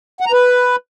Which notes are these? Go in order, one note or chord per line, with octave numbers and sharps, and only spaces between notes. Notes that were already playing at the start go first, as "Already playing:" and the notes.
F#5
A#5
B4